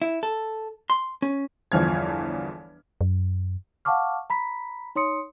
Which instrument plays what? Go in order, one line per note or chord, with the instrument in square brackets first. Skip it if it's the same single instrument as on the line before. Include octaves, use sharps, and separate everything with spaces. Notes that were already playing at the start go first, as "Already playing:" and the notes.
[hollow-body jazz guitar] E4
A4
C6
C#4
[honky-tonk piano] G1 E2 F3 F6 G#6
[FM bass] F#2
[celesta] F5 F#5 A5 C#6 D6 F6
A#5 B5 B6
D#4 C#5 C6 D#6 C#7